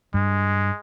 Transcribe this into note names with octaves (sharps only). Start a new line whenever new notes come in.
G2 G#3